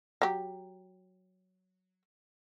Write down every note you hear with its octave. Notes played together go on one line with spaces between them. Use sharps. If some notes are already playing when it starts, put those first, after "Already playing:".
F#3 G4